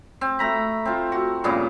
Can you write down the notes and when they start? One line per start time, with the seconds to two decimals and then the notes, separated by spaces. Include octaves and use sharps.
0.21 C4
0.39 A3 A#5 B5
0.85 C4 F4
1.12 F#4
1.44 G2 A#2 C#3 B3